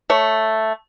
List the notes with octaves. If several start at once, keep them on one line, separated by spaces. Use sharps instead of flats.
A3 C#5